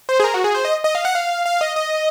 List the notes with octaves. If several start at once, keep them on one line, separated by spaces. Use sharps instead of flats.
C5
G#4
A#4
F#4
G#4
C5
D#5
D#5
F5
F#5
F5
F5
D#5
D#5